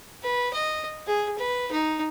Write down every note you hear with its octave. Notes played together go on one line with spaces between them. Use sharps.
B4
D#5
G#4
B4
D#4